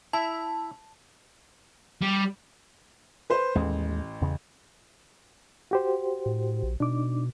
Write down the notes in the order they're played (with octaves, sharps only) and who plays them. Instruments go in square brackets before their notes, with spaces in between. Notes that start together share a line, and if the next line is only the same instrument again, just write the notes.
[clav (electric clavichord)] E4 E5 [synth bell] A5
[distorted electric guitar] G3
[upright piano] B4 C5 C6
[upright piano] A1 [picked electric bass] D#2 G#3
[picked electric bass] E2 C#3
[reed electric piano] F#4 G4 C5
[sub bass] A2
A#1
[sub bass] B2 [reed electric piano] D4 D#4 D6